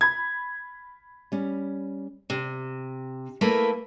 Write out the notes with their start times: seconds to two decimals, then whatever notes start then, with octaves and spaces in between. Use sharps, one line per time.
0.01 B5 G#6
1.32 G3 C#4
2.30 C3
3.41 A3 A#3 E4 A#4 B4